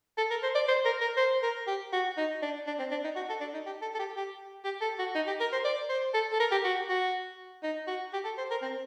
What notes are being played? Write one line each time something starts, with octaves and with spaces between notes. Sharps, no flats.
A4
A#4
C5
D5
C5
A#4
A#4
C5
A#4
G4
F#4
D#4
D4
D4
C4
D4
D#4
F#4
A4
D4
D#4
G4
A4
A4
G4
G4
G4
A4
F#4
D#4
G4
A#4
C5
D5
C5
A4
A4
A#4
G4
F#4
F#4
D#4
F#4
G4
A4
C5
A#4
C4